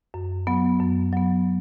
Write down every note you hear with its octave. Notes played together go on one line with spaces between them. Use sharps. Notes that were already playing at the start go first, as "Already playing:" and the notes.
F#2
F#3 B3
F#2
F#3 B3